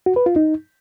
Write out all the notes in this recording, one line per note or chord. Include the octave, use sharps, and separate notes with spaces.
F#4
B4
F4
D#4